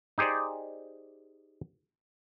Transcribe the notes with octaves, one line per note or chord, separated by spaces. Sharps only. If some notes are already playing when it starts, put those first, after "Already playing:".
D#4 G4 G#4 C5 D5